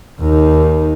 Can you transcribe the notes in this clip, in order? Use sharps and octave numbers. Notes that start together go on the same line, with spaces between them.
D#2 D#4